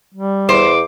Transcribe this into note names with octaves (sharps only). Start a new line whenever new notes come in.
G3
E2 C5 D6